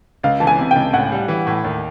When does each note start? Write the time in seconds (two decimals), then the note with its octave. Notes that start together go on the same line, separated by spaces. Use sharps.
0.23 C#2 F5
0.40 E3 A5
0.47 G#5
0.59 C3
0.71 G5
0.76 C#2
0.93 A2 F#5
1.12 G3
1.28 E3
1.47 A2
1.64 D#2